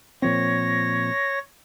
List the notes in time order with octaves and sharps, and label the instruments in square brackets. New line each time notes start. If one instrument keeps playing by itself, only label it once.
[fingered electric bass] A#2 F3 C4 [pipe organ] C#5 A#6